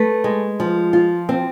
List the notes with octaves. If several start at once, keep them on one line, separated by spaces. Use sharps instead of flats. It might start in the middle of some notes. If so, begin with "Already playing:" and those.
Already playing: A3 B4
G#3
F3
F4
C4